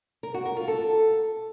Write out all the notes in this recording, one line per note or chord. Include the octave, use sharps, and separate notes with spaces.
A#4
F#4
A#4
F4
A4